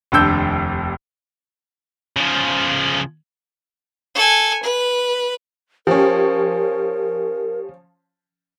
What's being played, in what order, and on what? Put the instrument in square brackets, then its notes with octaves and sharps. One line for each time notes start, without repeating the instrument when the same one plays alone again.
[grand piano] F1 D#2 D4 E6 G6
[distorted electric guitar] C#3 F3
[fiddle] A4 G#5
B4
[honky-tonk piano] F3 C#4 [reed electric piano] G4 [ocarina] A#4